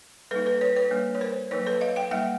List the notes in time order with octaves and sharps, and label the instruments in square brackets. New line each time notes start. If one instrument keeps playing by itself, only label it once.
[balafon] G3 A#3 D#4 A4 B4
A4 B4
B4 C#5
B4 C#5
G3 A#3 D4
C#5
A#4 C5
F#3 A#3 D#4 B4 C#5
A4 B4
D#5 F5
F5 G5
G3 A#3 D#4 E5 F#5